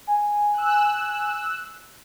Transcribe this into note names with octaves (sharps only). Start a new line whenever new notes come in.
G#5
E6 F#6